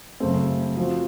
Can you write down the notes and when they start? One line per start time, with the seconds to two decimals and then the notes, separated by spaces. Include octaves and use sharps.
0.20 F#2 C#3 A3 C4
0.77 F3 C4 F#4